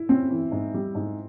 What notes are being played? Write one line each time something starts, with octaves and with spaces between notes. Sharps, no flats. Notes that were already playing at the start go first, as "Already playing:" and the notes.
Already playing: E4
C4 C#4
E3
G#2
G3
G#2